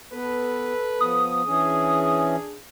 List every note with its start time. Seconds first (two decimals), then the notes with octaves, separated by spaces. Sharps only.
0.13 B3 A4 B4
1.01 F3 B3 D#6
1.46 E3 C#4 D4 G#4